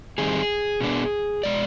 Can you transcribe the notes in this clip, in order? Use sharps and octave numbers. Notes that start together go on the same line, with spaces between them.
D#3 G3 C4 G#4
B2 B3 D4
B2 G#3 D5